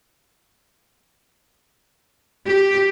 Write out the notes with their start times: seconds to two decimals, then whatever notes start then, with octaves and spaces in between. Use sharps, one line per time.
2.46 G4